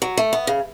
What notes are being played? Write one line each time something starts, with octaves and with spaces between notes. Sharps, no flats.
F#3
A3
B3
C#3